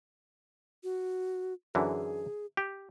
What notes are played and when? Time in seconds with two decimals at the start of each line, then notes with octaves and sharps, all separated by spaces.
0.84 F#4
1.75 F#2 D3 E3 G#4
2.57 G4